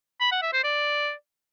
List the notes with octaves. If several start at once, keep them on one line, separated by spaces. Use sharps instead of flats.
B5
F#5
E5
C5
D5